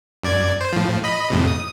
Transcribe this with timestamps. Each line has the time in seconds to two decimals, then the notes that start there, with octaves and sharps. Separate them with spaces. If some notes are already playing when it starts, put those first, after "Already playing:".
0.23 F#2 D5 G#6
0.61 C5
0.73 A2 F3
1.04 D#5 B5
1.30 F2 A2 C3
1.48 D#6